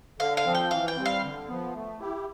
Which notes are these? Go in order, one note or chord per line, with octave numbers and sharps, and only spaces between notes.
D3 F5
F5
F3 C4
G5
E3 F5
G5
G3 C4
F5
D3
F3 B3
A3
E4 G4